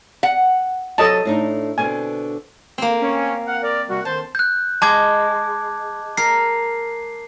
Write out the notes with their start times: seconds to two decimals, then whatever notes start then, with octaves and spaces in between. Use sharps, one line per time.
0.23 F#5
0.98 C3 F#3 A4 D#5 A5
1.25 A2 D4 D#4
1.78 B2 D3 C4 G#5
2.78 A#3 C4
3.01 C#4
3.48 F5 F#5
3.62 A#4 D5
3.89 C3 G3 F#4
4.05 D#3 C5 A5
4.35 F#6 G6
4.82 G#3 A5 D6 G#6
6.17 A#4 C7